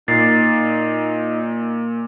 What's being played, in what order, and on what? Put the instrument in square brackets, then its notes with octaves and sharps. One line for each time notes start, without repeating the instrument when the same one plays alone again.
[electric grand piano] A#2 [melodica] D#4 [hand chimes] A6 C7